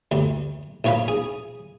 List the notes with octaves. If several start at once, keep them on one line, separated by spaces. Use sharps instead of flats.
D2 G2
B1 A#2 C#5 F5 B5
G#4